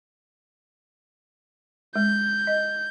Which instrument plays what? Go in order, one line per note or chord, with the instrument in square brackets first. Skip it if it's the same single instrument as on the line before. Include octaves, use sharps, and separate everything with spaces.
[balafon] G#3 [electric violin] G6
[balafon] D#5